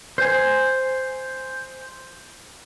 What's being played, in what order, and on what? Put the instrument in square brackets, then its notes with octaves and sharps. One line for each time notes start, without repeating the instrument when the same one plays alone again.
[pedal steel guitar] C5 G#5